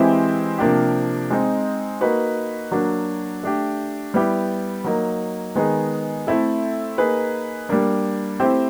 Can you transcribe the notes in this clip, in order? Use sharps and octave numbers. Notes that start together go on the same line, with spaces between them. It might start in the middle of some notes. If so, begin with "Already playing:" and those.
Already playing: E3 G#3 C4 E4 G4
C3 F3 A#3 D4 G4
G#3 C4 D#4
A#3 D#4 F#4 B4
F#3 A#3 D4 F#4
A3 D4 G4
G3 B3 E4 G4
F#3 A#3 D#4
D#3 G#3 B3 D#4 G#4
A3 C4 E4 A4
A#3 D#4 G#4 B4
G3 A#3 D4
A3 C4 E4 G4 C5